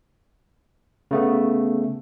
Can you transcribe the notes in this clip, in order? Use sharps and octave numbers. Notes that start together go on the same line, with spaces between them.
C#3 A3 B3